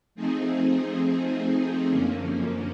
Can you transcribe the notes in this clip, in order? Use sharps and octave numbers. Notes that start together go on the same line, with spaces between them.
F3 A3 C4 D#4 G#4
F#2 D3 F3 A#3 C#4